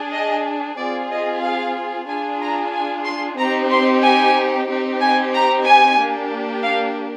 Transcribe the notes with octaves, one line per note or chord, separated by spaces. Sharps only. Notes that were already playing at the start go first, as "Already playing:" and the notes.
Already playing: D4 G#4
D#5
C4 F4 G#4 D5
D#5
F5
D4 F4 G#4 G#5
A#5
G#5
C6
C4 D#4 G4 A#5
C6
G#5
C4 D#4 G4
G#5
A#5
G#5
A#3 D4 G4
F5